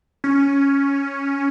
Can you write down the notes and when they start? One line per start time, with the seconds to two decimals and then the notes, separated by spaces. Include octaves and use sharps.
0.24 C#4